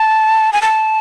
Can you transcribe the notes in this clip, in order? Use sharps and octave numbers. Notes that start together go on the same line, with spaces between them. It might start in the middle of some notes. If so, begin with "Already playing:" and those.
Already playing: A5
G#5
A5